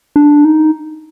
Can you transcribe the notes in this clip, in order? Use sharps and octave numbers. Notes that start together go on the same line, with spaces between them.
D4
D#4